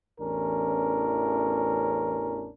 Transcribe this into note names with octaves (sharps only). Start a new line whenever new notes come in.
A1 E2 C#4 D4 A#4